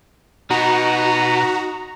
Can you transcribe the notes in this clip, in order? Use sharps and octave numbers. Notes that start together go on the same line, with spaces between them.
B2 B3 D#4 F#4 A#5